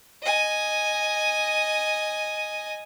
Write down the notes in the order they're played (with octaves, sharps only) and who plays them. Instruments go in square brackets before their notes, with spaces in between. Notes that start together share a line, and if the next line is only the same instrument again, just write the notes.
[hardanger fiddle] D#5 G#5